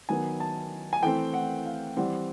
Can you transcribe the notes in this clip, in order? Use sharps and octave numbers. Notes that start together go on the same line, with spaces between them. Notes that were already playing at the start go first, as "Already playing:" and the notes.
D#3 F#3 B3 G#5
A5
G#5
E3 A3 C4 G5
F#5
F5
E3 G3 C4 F#5